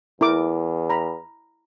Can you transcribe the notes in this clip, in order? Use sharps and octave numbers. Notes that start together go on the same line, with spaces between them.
E2 E4 A#4 D6
A#5 B5